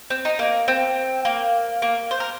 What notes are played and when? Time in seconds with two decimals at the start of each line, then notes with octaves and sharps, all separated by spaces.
0.10 C4
0.25 D#4
0.39 A#3
0.68 C4
1.25 A#3
1.82 A#3
2.11 C5
2.20 A#4